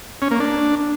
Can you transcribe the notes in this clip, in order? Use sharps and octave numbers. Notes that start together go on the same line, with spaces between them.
C#4
A#3
D4